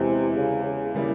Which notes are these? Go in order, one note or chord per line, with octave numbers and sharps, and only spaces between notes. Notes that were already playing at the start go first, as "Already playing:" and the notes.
Already playing: E2 C3 E3 G#3 E4
C#3
C#3
C#3 G3 A#3 E4